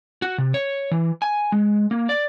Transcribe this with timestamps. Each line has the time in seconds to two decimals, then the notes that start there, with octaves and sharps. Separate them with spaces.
0.22 F#4
0.38 C3
0.54 C#5
0.91 E3
1.22 G#5
1.52 G#3
1.91 A#3
2.09 D5